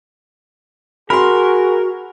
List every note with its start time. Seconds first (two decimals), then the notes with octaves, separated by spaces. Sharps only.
1.10 F#4 G#4 A#4 B5 C6